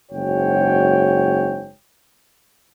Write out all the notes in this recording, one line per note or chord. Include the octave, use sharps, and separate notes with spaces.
F#1 G#2 F#4 C#5 G5